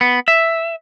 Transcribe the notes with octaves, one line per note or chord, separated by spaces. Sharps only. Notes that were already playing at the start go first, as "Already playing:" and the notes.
B3
E5